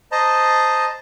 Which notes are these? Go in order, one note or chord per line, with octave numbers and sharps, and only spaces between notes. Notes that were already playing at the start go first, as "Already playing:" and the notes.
C5 D#5 A5 A#5